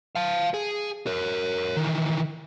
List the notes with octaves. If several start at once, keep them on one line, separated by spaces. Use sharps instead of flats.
F5 A5
G#4
A#4 C#5
D#3 E3